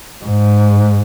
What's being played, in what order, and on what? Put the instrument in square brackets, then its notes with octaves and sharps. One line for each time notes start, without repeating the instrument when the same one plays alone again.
[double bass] G#2